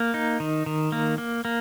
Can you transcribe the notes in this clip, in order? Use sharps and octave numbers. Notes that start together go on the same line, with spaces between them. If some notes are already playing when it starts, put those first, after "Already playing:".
Already playing: A#3
D#4
D#3
D#3
A#3
A#3
A#3